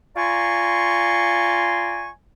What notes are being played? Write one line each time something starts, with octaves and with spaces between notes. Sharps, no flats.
F4 D5 G#5 A#5 C6 C#6